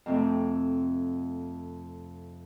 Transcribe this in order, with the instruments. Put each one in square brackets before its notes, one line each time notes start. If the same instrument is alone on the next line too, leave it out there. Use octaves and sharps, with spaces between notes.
[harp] F2 C3 A3